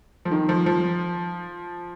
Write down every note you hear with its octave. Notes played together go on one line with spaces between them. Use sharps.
F3
D#3
F3
F3